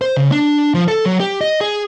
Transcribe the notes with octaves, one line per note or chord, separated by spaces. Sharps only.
C5
C#3
D4
F3
A4
F#3
G4
D#5
G#4